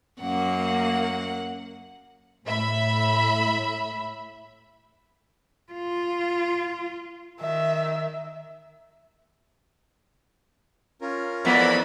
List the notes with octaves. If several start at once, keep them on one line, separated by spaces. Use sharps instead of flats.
F#2 A#3 F#5
A2 E5 B5
F4
D#3 E5
C#4 F4 A#4
F2 G#2 E3 B3 D5 E5 B5